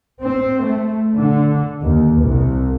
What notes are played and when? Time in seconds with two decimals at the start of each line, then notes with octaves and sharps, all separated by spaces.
0.23 C4
0.64 A3
1.15 D3
1.81 D#2
2.21 C2